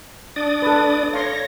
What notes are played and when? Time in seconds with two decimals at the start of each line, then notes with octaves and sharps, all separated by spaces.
0.36 D4 D5 D#6
0.62 A4 B4
1.13 C#5 F5 C6 A#6